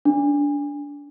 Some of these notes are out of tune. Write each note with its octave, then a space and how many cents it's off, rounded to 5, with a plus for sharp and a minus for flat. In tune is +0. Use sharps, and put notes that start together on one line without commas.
D4 -20